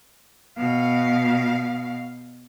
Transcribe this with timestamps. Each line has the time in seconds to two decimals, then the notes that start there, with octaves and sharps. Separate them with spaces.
0.57 B2 F5